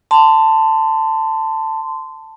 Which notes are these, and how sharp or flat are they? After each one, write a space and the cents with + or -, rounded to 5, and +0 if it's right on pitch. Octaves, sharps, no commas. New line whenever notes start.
A5 +10 C6 -20